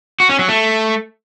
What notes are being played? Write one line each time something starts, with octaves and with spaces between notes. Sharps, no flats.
F#4
C#4
F#3
A3